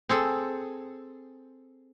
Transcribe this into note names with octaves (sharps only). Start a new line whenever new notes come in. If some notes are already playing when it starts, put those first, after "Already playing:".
C4 G#4 A4